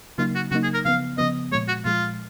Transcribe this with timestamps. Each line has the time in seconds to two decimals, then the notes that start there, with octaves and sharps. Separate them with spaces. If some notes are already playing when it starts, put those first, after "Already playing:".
0.18 C#3 F#3 A#3 D#4 F4
0.35 F#4
0.51 C#3 F#3 A#3 D#4 F#4
0.63 G#4
0.74 A#4
0.85 C#3 F3 B3 F5
1.18 C#3 F3 B3 D#5
1.52 A#2 F3 G#3 C#5
1.68 F#4
1.85 A#2 F3 G#3 F4